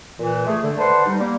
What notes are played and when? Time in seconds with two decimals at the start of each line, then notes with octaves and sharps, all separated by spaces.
0.20 A#2 E3
0.46 A3 G#4
0.62 D3 A3
0.78 B4 C5 D5 F#5 A5 C6
1.06 G3 D#4
1.19 G3 A#3